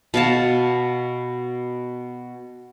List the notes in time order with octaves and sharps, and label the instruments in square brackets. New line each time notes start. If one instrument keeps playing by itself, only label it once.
[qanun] B2 F5 A5